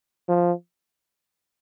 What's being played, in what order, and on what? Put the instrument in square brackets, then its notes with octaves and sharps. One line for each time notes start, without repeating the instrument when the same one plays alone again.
[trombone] F3